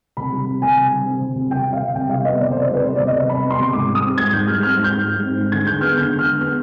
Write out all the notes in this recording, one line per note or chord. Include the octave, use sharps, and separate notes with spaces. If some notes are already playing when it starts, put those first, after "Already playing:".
C3 B5
G3
C4
C3 G#5
C3
G3
C4
C3
C3
G3 G5
C4
F5
C3
C3 G5
G3 F5
B3 D#5
C3 D5
C5
C3
D5
G3 B4
B3 C5
D5
C3
D#5
C3
G3 B5
B3
C6
C3
G#2 D6
G3
D#6
C4
G#2 G#6
G#2 G6
G3 F6
C4 F6
G#2
G6
G#2
G3
C4
G#2
D3 G#6
G#3 G6
B3 F6
D3 G6
D3
F6
G#3
B3 F6